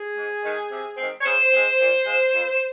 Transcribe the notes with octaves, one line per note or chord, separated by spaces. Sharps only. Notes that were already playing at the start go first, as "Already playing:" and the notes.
Already playing: G#4
G#2
D#3 G#3 D#4
C3
D#3 G#3 C4
C#5
C#3 C5
G#3 C4
A#2
F3 G#3
F2